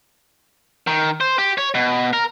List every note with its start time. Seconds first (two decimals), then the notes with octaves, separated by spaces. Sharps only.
0.87 D#3
1.21 C5
1.38 G4
1.58 C#5
1.75 B2
2.13 A#4